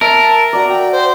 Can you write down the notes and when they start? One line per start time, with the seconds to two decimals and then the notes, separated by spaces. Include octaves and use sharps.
0.01 A#4 E5 A5
0.53 F#4 D5 A#5
0.69 G5
0.92 C5